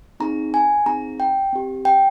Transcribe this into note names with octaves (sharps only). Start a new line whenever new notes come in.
C4 D#4 G#4 A#5
G#5
C4 D#4 G#4 A#5
G5
C4 G4
G5